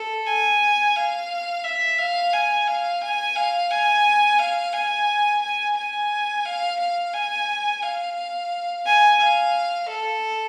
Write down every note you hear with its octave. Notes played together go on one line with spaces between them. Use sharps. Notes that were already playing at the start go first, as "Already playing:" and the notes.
Already playing: A4
G#5
F5
E5
F5
G#5
F5
G#5
F5
G#5
F5
G#5
G#5
G#5
F5
F5
G#5
F5
G#5
F5
A4